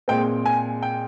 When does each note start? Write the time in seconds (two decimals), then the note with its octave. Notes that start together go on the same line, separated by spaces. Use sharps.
0.08 A#2 G#3 C4 G5
0.46 G#5
0.83 G5